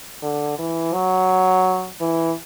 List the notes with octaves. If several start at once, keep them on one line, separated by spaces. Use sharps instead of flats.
D3
E3
F#3
E3